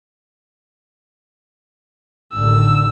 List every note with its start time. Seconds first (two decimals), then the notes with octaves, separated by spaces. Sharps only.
2.34 A1 D3 D#3 E6